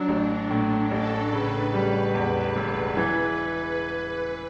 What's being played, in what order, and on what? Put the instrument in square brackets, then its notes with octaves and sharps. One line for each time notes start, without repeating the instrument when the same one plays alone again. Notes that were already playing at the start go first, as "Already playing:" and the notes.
Already playing: [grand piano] F#3 [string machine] D4
[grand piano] A1
[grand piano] A2 [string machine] D4
[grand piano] A1 [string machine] A4
[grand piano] C#3 [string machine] B4
[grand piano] G3
[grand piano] E2 [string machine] B4
[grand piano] E1 [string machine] B4
[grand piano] E3 [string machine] B4